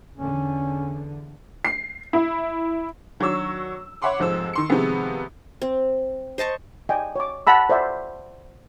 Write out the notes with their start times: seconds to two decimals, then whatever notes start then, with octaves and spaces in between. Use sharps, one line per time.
0.17 E2 D3 C#4
1.65 C7
2.13 E4
3.20 D#3 F#3 D4 C#5 C#6 E6
4.02 C#5 E5 F#5 B5 C6 D6
4.19 F1 G#2 F3 C5 E6
4.53 D#3 C6 C#7
4.69 C3 D#3 F3 G#3 B3 C4
5.62 C4
6.38 C5 D#5 A5 C#6
6.89 D5 D#5 G5 G#5
7.16 C#5 D6
7.47 F#5 A5 B5 E6
7.69 C5 D5 E5 F#5